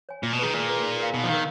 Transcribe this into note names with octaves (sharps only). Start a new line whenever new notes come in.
C#5 G#5
A#2 F4
B2
D#3 G#4 B4
A#2 F4
G#4 B4
D#4
A#4 F5
B2 D#4
F3
D#3 A#4 F5